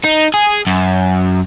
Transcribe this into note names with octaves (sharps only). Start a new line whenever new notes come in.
D#4
G#4
F#2